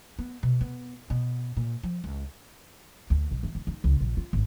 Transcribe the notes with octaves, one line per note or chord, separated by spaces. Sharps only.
B3
B2
B3
B2
A#2
F3
C#2
D2
B1
E3
D#4
D#4
C#2
A#1
F4
G#1